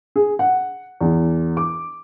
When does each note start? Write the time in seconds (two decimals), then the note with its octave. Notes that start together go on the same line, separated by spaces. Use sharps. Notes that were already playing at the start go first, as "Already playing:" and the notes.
0.16 G#4
0.39 F#5
1.01 E2
1.57 D6